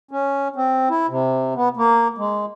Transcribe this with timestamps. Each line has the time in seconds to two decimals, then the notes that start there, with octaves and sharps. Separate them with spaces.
0.11 C#4
0.56 C4
0.90 E4
1.09 C3
1.55 B3
1.77 A#3
2.18 G#3